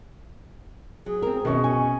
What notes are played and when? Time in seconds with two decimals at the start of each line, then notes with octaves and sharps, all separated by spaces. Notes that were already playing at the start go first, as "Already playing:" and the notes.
1.06 F#3 G#4
1.22 C4 A#4
1.45 F#2 B2 D#3 C#4 D#5 C#6
1.64 C#4 G#5